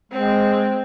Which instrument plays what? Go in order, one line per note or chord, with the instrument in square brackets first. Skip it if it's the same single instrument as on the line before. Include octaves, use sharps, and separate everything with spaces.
[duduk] G#3 [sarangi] C4